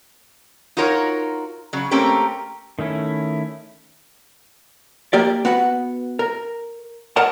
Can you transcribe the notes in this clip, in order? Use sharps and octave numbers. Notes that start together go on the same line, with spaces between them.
D#4 F4 F#4 A#4 C#5
C#3 F#3
A3 A#3 C4 C#4 G4 A#4
D#3 A3 C#4 E4
A#3 G4 D5
B3 F#4 B4 F#5
A#4
A#4 C#5 D#5 F#5 A5 A#5